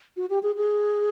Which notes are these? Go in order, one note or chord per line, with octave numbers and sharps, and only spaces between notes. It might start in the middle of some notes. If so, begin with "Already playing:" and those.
F#4
G4
G#4
G#4